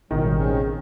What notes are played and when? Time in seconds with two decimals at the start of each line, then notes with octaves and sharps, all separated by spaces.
0.11 A1 B2 D#3 F#3 G3
0.34 C#3 C4 C#4